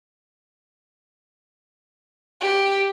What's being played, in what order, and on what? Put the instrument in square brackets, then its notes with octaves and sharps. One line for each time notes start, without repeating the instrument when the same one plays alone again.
[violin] G4